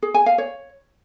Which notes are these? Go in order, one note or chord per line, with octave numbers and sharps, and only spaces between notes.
G#4
G#5
F5
C#5